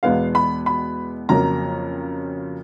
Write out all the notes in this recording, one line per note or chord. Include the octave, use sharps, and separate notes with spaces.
E2 B2 G#3 B3 F5
B5
B5
F2 C#3 F#3 A#3 A#5